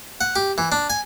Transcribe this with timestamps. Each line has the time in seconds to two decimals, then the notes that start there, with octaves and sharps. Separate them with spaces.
0.21 F#5
0.36 G4
0.58 E3
0.72 D4
0.90 G#5